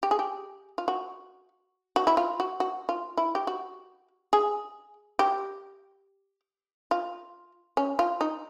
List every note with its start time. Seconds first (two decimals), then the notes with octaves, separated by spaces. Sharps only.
0.03 G4
0.11 G#4
0.19 G4
0.78 F4
0.88 F#4
1.96 F#4
2.07 E4
2.17 F4
2.40 F#4
2.60 F#4
2.89 F4
3.17 E4
3.35 G4
3.47 F#4
4.33 G#4
5.19 G4
6.91 F4
7.77 C#4
7.99 F4
8.21 D#4